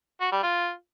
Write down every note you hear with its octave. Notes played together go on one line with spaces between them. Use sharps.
F#4
G3
F4